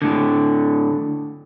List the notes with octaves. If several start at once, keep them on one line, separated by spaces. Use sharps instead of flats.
A2 D3